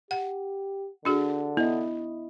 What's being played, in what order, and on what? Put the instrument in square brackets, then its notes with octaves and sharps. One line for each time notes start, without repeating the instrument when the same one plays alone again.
[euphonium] G4 [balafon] F#5
[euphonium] D3 [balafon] D4 F#4 G#4
[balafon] B3 [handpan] E4 D#5